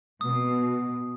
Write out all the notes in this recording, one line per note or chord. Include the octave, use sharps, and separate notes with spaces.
B2 D#6